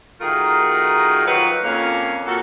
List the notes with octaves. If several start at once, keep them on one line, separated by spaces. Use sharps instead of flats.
D#3 A3 F4 F#4 G#4 A#4
D#3 F3 F#3 F4 F#4 B4
F2 A#3 C#4
A#2 F#4 A4